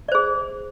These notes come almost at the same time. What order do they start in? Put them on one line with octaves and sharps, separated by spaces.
D5 C5 G#4